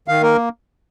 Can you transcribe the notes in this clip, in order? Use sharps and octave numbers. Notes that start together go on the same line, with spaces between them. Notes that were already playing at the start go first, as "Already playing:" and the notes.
D#3 F5
A#3 A#4